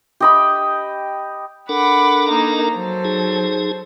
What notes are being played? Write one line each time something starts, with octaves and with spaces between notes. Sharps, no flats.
G4 D#5 B5
D4 A4 A#4 F#5 B5 D6
A#3 D#4
F#3 A4 C5
D#4 G#4